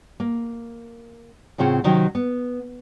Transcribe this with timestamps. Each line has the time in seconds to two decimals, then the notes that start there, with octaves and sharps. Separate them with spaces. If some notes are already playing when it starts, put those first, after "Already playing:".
0.20 A#3
1.58 A2 C#3 C4 F4 F#5
1.84 C3 D#3 F#3 C#4
2.15 B3